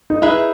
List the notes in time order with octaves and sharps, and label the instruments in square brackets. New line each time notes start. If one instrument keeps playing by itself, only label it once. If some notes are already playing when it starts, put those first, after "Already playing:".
[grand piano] D#4
[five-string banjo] D#4 G#4 B4 E5 [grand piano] E4